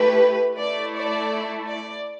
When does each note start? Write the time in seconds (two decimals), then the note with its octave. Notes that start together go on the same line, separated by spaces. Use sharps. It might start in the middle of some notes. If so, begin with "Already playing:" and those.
Already playing: A3 E4 G4 B4
0.58 A3 E4 A4 D5
0.94 D5
1.67 D5